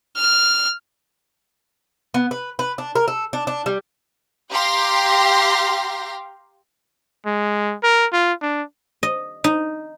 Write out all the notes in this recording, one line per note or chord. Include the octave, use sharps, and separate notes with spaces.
F6
B3
B4
B4
D4
A#4
A4
D4
D4
G3
G4 F5 G5 A#5 C6 A#6
G#3
A#4
F4
D4
D#5
D#4